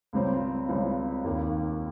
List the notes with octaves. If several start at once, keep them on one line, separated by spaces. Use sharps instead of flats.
C#2 C#3 G3 C4
C#2 C#3 G3 C4
D#2 D#3 A#3